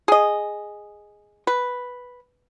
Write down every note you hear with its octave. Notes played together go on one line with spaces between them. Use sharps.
G#4 D#5
B4